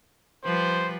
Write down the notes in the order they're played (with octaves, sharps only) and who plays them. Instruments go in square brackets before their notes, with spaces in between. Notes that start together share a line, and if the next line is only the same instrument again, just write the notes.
[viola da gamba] F3 G3 B4 [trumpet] C5